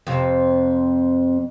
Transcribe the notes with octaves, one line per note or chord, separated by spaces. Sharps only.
F2 C3